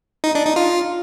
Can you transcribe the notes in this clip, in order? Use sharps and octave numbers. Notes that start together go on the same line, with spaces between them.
D#4
D4
D#4
F4